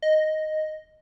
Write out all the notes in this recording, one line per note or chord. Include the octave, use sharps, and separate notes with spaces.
D#5